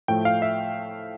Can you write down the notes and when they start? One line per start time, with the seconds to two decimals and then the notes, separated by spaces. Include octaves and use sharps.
0.08 A2 F3 A3 G5
0.25 F5
0.42 E5